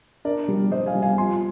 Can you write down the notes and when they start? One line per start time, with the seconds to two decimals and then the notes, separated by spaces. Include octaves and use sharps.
0.25 D4 A#4 D5
0.48 G3
0.71 G3 C5 D#5
0.86 F5 G#5
0.95 G3
1.02 F5 G#5
1.18 F3 G#5 C6